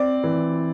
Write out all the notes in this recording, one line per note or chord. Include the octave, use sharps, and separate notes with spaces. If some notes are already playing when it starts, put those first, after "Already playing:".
Already playing: C4 D5
E3